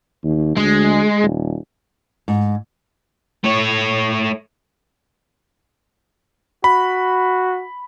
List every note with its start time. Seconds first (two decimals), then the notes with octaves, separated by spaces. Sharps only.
0.24 D#2
0.57 D2 G#3
1.22 D#1
2.28 G#2
3.44 A3 C#5
6.64 F#4 B5